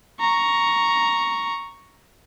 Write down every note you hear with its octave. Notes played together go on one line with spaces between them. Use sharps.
A#5 C#6